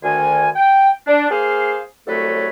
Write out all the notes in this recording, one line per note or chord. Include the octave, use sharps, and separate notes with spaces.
D2 D#3 G#5
G5
D4
A#3 G#4 C5 F5
C2 F#3 A3 A4 B4 C#5